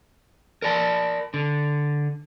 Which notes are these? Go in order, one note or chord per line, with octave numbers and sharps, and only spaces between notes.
A#4 D5 A5
D3